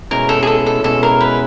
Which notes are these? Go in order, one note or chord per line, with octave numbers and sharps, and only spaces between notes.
B2 G#3 C#4 E4 A#4
A4
G#4
A4
A4
B2 G#3 C#4 E4 A4
A#4
B4